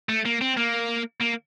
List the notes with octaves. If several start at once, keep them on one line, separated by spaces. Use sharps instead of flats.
A3
A#3
C4
A#3
A#3